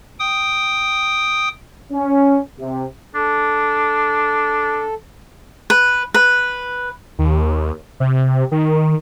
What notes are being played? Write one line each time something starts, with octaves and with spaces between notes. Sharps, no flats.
G5 D#6
C#4
C3
D4 A4
B4
B4
D#2
C3
D#3